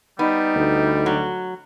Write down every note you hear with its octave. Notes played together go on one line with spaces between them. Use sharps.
G3 B3 D#4
D2
F#3